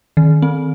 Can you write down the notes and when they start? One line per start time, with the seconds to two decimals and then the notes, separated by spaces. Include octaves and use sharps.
0.17 D#3
0.42 C4